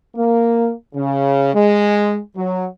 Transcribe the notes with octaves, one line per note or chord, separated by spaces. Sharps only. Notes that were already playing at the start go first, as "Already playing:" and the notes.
A#3
C#3
G#3
F#3